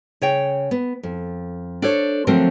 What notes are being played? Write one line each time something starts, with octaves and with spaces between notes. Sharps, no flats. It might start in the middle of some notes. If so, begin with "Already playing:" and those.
C#3 C#5 G5
B3
F2
D4 A4 C5 C#5
D3 F3 F#3 A3 C4 A#4